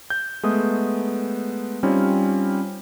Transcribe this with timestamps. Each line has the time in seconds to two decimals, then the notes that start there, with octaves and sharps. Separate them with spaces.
0.10 G6
0.43 G#3 A3 B3 D#6
1.83 G3 C4 C#4 D#4 F4